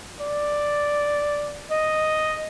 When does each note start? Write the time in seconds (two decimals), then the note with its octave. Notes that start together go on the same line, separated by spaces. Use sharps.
0.20 D5
1.71 D#5